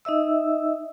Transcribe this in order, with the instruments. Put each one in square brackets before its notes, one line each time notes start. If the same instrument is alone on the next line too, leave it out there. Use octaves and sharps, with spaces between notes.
[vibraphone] D#4 D#5 E5 E6